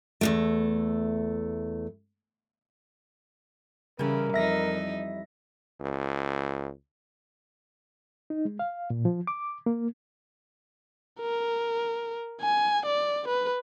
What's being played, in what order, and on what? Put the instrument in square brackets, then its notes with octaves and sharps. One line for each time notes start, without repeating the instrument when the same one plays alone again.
[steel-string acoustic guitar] E2 G2 A3
[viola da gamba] C#3 [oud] E3 G3 [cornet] A#4
[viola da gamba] F2 D#4 [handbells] E5 A#6
[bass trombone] C#2
[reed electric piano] D#4
G#3
F5
A#2
F3
D6
A#3
[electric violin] A#4
G#5
D5
B4